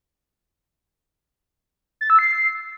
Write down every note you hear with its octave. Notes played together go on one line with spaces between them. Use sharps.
A6
E6
C7